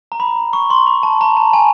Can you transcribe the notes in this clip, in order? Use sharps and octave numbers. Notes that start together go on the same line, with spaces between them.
A#5
B5
C#6
C6
B5
A5
A#5
A5
G#5